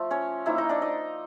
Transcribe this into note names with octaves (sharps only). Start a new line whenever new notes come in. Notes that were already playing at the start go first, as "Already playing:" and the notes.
Already playing: F3 A3 F4
C#4 C#5
F3 A#3 D#4 E4 E5
D#4 D#5
D4 D5
D#4 D#5